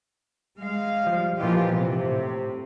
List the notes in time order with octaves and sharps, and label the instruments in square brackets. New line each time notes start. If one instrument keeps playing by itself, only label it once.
[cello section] G#3 F5
[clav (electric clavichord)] F3 G3
[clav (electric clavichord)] A#2 E3 D#5 [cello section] F3 F4 G4
[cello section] C3
[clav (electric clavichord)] A2